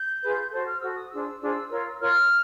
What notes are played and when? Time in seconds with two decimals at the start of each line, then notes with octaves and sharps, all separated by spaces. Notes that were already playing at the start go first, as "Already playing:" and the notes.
Already playing: G6
0.21 F4 G#4 B4
0.51 F#4 A4 C5 G6
0.66 F6
0.80 F#4 A4 C5 E6
0.96 D#6
1.10 D4 F4 G#4 C5 E6
1.40 D4 F4 G#4 C5
1.71 F4 A#4 C#5
2.00 F4 A#4 C#5 F6